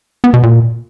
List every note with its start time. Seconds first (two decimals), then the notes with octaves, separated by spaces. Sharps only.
0.24 B3
0.34 B2
0.43 A#2